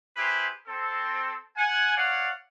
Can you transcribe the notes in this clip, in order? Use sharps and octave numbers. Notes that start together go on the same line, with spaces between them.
E4 G4 G#4 B4 C5
C4 A4
F#5 G#5
C#5 D5 F5 F#5